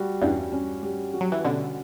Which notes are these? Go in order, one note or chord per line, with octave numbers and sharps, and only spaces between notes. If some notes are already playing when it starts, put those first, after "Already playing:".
Already playing: G3 F#4
E2 G2 C#4
C#4
G3
F#4
F#3
E3
B2 D3 C#4